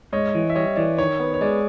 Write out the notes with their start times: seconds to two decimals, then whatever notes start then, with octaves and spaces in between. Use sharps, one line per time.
0.12 G#2 C#5 D#5
0.35 E3
0.50 E5
0.55 G3 C#5 D#5
0.76 E3 D5
0.98 D#3 C#5
1.20 B3
1.34 C#5
1.41 G#3 D5